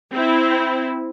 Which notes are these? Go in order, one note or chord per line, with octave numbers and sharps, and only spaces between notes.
C4 E4